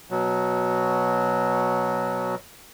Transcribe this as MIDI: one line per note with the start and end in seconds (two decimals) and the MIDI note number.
0.11 2.35 47
0.11 2.35 54